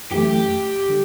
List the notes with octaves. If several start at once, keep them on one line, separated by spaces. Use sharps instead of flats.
F#2 E3 A3 G4
D3 G3